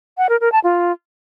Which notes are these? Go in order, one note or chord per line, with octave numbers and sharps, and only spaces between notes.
F#5
A#4
A#4
A5
F4